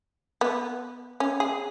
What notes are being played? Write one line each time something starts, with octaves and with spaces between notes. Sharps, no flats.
B3
C#4
G#4